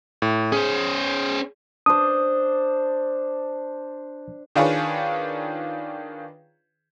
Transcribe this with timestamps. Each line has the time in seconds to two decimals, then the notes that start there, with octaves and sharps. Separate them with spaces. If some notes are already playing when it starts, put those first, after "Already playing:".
0.22 A2
0.52 C#4 G#4 C5
1.86 D4 C5 D#6
4.56 D#3 D4 F4 G#4 B4 C#5